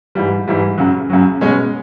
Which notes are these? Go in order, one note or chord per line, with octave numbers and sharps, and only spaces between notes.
G#2 E3 G3
G#2 E3 G3
F#2 C#3 F#3
F#2 C#3 F#3
B2 G#3 C#4